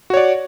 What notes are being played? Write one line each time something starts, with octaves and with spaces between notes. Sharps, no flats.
F#4 C#5 D5